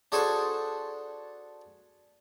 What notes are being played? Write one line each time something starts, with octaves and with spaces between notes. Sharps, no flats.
D4 F#4 G#4 A4 C5